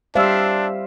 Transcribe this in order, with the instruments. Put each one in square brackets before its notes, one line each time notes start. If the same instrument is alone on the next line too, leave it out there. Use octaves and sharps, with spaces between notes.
[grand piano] G3 E6 [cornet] D4 [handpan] C5 E5 F5